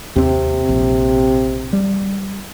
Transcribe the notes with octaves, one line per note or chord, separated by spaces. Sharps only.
D#2 C3 C4
A#1
G3